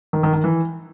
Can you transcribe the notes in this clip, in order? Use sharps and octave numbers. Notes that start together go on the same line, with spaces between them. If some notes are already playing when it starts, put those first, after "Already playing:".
D#3
D#3
D#3
E3